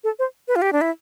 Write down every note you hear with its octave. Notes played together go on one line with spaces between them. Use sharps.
A4
C5
B4
F4
G4
D4
E4